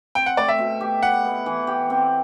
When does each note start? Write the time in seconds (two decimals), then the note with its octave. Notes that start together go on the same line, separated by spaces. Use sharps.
0.15 C4 G5
0.26 F#5
0.37 A3 D5
0.48 E5
0.58 B2
0.81 G4
1.03 E4 F#5
1.25 B3
1.46 E3
1.67 G4
1.90 C4